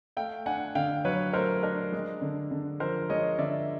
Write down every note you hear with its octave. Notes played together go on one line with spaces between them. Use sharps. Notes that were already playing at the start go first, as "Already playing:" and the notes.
A3 F5 G5
D4 F#5 G#5
D3 F5 G5
F#3 B4 C#5
A3 A#4 C5
D4 A#4
G#3
D3
D3
F3 A#4 C5
G#3 C#5 D#5
D3 D5 E5